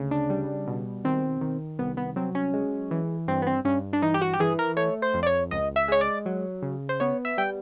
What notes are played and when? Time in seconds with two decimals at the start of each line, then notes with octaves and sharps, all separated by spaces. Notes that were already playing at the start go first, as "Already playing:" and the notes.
Already playing: D2 C#3
0.11 D4
0.30 G3
0.67 B2
1.04 D#3 C4
1.41 D#3
1.79 C2 B3
1.97 B3
2.16 F#3 C4
2.35 C#4
2.54 G#3
2.91 E3
3.28 G2 C4
3.42 B3
3.47 C4
3.65 G2 C#4
3.93 D4
4.02 E3 D#4
4.14 G4
4.22 F#4
4.34 G4
4.40 E3 G#4
4.59 A#4
4.76 A3 C#5
5.02 C5
5.14 F2
5.23 D5
5.26 C#5
5.51 C#2 D#5
5.76 E5
5.88 G#3 C#5
6.01 D5
6.26 F#3
6.62 C#3
6.89 C5
7.00 B3 C#5
7.25 E5
7.38 G3 G5